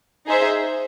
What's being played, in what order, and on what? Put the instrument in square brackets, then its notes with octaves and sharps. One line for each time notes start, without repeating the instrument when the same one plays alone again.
[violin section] D#4 G#4 C5 E5